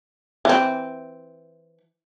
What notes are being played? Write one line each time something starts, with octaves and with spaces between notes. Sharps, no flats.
E3 C4